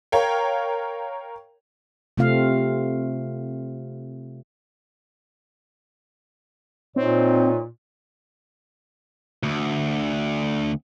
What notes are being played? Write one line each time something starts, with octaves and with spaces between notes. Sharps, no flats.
A#4 C#5 F5 G5
C3 A3 C4 F4 F5
A#2 C4 D#4 C5 C#5
D2